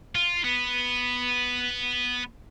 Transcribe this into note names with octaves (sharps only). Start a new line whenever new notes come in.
F4
B3